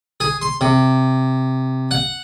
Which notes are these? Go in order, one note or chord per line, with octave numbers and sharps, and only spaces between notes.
G#4
C6
C3
F#5